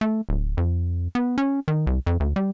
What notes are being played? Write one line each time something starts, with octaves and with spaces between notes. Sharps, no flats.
A3
D1
F2
B3
C#4
D#3
C2
F2
D2
G3